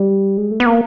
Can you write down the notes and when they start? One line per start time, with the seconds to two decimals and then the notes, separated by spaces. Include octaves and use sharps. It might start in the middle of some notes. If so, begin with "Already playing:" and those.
Already playing: G3
0.37 G#3
0.51 A3
0.60 B3
0.66 A#3